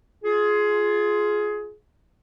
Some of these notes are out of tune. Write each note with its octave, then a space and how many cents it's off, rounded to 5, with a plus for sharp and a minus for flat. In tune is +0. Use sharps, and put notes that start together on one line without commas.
F4 +0 G#4 +15